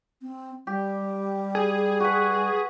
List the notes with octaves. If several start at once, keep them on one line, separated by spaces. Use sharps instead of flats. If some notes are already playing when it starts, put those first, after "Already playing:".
C4
G3 G4
G#4
F#4 B4